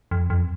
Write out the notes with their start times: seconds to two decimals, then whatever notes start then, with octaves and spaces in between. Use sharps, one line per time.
0.11 F2
0.30 F2